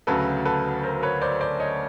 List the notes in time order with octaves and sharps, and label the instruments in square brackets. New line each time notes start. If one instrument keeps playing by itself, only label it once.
[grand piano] D2 C#3 F#3 A3 A4 B4
A4 B4
A#4 C5
B4 C#5
C5 D5
C5 D5
C#5 D#5